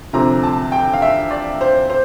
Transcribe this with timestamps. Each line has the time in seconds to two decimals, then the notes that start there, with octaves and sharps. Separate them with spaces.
0.13 D2 C3 F3 C4 A#5
0.43 A5
0.72 G5
0.94 F5
1.02 E5
1.31 D5
1.61 C5
1.90 C5